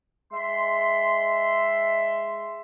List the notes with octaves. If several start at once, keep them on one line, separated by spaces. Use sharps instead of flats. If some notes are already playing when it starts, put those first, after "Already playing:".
G#3 E5 C6